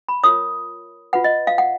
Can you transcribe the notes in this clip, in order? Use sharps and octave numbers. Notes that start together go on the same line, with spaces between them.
B5
F4 A#4 C#5 D#6
F4 B4 F#5
D#5
F5
F#5